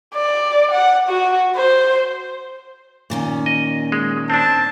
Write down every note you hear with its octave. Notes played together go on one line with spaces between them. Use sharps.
D5
F#5
F#4
C5
A#2 D#3 C#4
D#5
G#3
C4 D4 A5